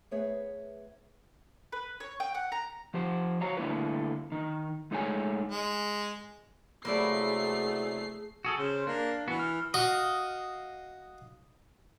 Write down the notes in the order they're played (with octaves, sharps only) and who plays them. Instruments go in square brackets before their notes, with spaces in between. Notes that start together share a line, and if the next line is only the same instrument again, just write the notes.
[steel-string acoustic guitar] A3 B3 G#4 B4 C#5 E5
[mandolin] B4
C#5
G5
F#5
A#5
[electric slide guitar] F3 G4 C5
F#4 C#5 F5 A#5
D3 A3 A#3 E4 B4
D#3 D#4
G#3 A3 D#4 G#4 C#5 G#5
[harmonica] G#3
[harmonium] C3 F#3 [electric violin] A3 C7 [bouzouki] A#3 E4 D5 [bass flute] G#4
[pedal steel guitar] F#4 G#4 A4
[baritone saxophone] C#3 [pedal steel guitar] C5
[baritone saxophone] A#3 [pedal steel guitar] D4
[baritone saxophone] E3 [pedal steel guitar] B3 F#4
[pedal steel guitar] F6
[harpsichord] F#4 [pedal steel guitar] D#5 F5